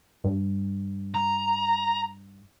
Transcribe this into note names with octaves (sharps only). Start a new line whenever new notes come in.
G2
A#5